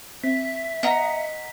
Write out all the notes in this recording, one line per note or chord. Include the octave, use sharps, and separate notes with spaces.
C4 E5 B6
B3 D#5 F#5 A#5